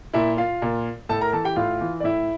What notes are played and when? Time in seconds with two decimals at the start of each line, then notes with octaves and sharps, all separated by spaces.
0.13 A#2 E4 E5
0.37 F4 F5
0.62 A#2
1.09 A2 A4 A5
1.21 A#4 A#5
1.33 E3 A4 A5
1.44 G4 G5
1.56 A2 F4 F5
1.81 E3
2.00 D5
2.04 A2 E4 E5